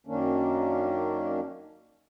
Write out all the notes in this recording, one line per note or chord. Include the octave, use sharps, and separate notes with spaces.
F#2 D#3 A#3 C#4 D4